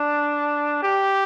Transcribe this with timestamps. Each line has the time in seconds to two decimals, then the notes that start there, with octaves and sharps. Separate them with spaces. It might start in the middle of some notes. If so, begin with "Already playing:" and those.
Already playing: D4
0.83 G4